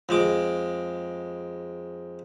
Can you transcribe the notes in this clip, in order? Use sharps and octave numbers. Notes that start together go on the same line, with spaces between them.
F2 G#3 D6